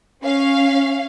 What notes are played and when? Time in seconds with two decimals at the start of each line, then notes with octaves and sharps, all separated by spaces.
0.22 C#4 F5